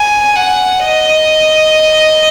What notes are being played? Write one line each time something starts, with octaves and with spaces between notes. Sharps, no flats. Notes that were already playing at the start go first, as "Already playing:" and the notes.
Already playing: G#5
F#5
D#5